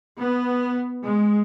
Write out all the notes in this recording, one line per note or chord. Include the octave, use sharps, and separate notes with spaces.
B3
G#3